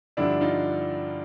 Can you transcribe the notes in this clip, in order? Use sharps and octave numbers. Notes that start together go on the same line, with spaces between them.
G2 D3 F3 D4 E4
D#4 F4